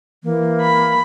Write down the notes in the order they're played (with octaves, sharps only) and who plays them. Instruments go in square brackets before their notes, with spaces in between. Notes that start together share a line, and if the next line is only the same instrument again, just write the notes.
[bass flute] E3 [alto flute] A#3
[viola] B5